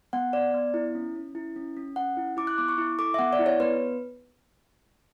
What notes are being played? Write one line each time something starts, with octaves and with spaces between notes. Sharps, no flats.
B3 F#5
B3 D5
B3
E4
C#4
C#4
E4
C#4
C#4
C#4 F#5
E4
E4 D6
F#6
B3 D6
C#6
E4
A4 D6
E5
B3 F#5
D5
E4
C#5
B3 B4